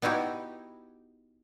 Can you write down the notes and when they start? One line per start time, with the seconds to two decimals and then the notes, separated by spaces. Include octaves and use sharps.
0.02 B3 D#4 E4 F#4 G4